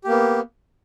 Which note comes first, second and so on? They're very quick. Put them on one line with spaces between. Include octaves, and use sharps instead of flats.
G4 A#3 B3